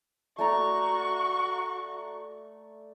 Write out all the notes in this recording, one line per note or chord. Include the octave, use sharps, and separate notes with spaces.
A3 F#4 D5 A#5 C#6